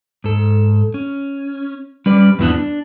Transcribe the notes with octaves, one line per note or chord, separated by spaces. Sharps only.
G#2 A4
C#4
G3 C#4 B4 D5
E2 G2 E3 B3 D4
D4